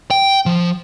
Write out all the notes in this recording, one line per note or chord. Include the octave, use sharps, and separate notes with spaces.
G5
F3